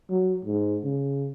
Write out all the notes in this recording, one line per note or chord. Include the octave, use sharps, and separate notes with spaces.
F#3
G#2
C#3